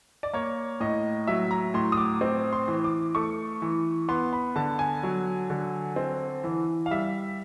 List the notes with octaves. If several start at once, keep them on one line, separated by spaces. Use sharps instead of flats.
D5
A#3 C#5
A2 D#5
F#3 E5
A#5
A2 C6
D#6
D6
C4
C6
E3
D6
A3 C#6
E3
B3 C6
B5
D3 A5
G#5
F#3
D3
C4
E3
F5
G3 E5